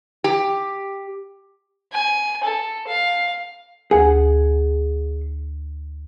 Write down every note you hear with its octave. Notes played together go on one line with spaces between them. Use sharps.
G4
G#5
A4
F5
D2 G#4 F#5 G#5